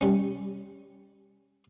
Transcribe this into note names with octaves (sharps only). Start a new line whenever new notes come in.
G3 C#4